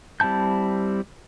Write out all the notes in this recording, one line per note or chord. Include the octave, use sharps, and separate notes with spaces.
G3 C4 E4 A5 G6